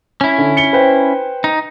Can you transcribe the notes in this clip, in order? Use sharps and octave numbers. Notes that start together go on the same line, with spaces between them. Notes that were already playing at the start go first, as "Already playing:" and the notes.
C#4 E4
D3
C#7 G7
B4 C5 G5
D#4